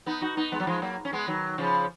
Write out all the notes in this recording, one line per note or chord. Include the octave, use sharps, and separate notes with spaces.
B3 D#4
D#4 F#4
B3 D#4
G#3 B3
F#3
F3 G#3
F#3 A#3
C#4
G#3 B3
D#3 F#3
C#3 F3